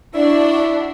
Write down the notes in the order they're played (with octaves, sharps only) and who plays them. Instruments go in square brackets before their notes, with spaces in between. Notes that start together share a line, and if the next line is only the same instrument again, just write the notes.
[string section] D4 F#4 [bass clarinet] E4 [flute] D5